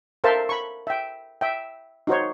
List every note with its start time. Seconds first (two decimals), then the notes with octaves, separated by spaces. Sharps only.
0.24 A4 A#4 C5 E5 F5 A5
0.49 B5 C#6
0.87 E5 G5
1.41 E5 G5
2.07 D#4 F#4 C5 C#5